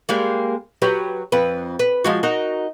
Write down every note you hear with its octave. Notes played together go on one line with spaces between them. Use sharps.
G3 G#3 A#3
F#3 G4 B4
F2 B4
B4
F3 G#3 F#4
D#4 F#4 A#4